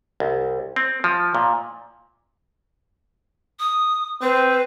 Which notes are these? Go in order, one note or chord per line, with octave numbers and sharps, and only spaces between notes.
C2
C4
F3
A#2
D#6
C4 B4